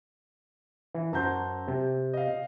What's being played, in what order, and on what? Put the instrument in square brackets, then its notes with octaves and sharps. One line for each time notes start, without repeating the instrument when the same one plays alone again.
[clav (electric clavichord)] E3
[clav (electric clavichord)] F#2 F#4 C5 [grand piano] A5 A#5 G6
[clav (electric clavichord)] C3
[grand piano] D#5 F5